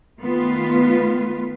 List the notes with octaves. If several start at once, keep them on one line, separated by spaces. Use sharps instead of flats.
D#3 A3 B3 F4 B4